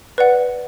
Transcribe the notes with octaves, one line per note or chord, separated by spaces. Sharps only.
B4 D5 F#5